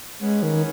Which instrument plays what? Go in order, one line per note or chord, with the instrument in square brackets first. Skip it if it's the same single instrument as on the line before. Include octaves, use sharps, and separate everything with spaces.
[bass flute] G#3 [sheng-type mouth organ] C#4 G#4 B4 F#5
[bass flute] D#3